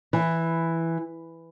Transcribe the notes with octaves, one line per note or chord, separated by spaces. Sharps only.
E3